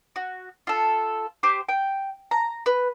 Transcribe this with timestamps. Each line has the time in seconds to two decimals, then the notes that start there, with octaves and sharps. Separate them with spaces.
0.16 F#4
0.67 F4 A4
1.43 G4 C5 D6
1.69 G5
2.31 A#5
2.66 B4